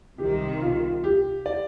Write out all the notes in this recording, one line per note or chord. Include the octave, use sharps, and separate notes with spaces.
C2 C3 D#3 G4
F4
G4
D5